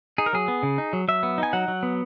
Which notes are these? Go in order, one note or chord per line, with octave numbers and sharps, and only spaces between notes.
D#4 G#4
A#4
F#3 G#4
B3
C#3
D#4
F#3
F#3 E5
B3
D#4 G#5
F#3 F#5
F#3
B3